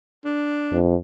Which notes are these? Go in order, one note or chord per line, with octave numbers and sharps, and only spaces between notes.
D4
F2